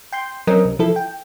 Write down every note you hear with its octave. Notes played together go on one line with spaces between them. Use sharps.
G5 C6 G6
F#3 C4 C#4 A#4 D#5
C2
F3 E4 A4
G5